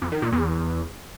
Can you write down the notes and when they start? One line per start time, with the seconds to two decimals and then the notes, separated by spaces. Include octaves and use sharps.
0.02 F2
0.12 D#3
0.22 A#2
0.32 E2